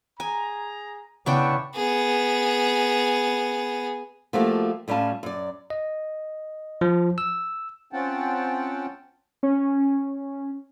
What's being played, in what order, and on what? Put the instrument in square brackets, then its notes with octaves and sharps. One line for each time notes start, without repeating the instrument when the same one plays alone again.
[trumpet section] G#4 A#5 [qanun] G#5
[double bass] C#3 [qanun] B3 E4 G5 [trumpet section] D4 F#5 C#6
[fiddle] B3 G#4
[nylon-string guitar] F3 G3 A3 A#3 F#4 G4
A2 G3 C#4 F4 A5
F#2 D5
[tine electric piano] D#5
F3
E6
[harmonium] C4 C#4 F4 F#5 G5 A5
[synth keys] C#4